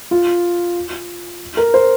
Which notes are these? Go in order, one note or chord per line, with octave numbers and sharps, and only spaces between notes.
F4
A#4
C5